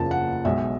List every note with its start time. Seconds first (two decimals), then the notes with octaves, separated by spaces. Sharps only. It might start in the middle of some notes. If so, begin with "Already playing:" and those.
Already playing: F#1 E2 C#3 F3 A#3 A5
0.11 F#5
0.45 B1 B2 G#3 E5